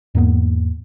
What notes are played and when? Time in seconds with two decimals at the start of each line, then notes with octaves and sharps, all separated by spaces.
0.15 E2 G#2 A#3 B3